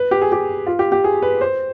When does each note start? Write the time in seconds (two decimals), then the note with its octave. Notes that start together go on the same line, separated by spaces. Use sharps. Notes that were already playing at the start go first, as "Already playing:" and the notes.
Already playing: B4
0.11 G4
0.22 G#4
0.32 G4
0.66 F4
0.79 G4
0.92 G4
1.04 G#4
1.22 B4
1.41 C5